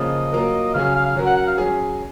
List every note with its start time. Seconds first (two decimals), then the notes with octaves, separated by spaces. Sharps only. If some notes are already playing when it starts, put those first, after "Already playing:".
Already playing: C#3 F3 A#3 F4 D#5
0.32 F#3 A#3 F4 A#4
0.74 C#3 F#3 C#4 G#4 F5
0.84 F5
0.95 F5
1.06 F5
1.15 F#3 C#4 F#4 A#4
1.26 F#5
1.37 F#5
1.47 F5
1.58 F#3 C#4 G#4